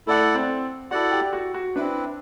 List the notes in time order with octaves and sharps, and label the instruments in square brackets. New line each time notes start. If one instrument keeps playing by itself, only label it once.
[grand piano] A3 [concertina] E4 A4 D5 F#5
[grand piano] C4
[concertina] E4 A4 D5 F#5 [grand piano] F#4
[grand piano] G4
F#4
F#4
[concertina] C4 E4 B4 [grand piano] D4